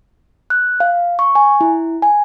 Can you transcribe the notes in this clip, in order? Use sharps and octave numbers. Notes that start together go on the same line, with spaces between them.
F#6
F5
C#6
G#5
E4
G#5